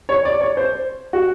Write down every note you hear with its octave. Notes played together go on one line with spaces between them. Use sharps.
C#5
D5
C#5
C5
F#4